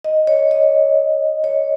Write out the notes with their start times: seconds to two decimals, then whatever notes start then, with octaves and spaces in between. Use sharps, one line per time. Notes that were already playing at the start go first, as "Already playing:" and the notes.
0.04 D#5
0.27 C#5
0.51 D#5
1.44 C#5